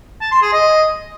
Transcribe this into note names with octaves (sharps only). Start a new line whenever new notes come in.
A5
C6
G#4
D#5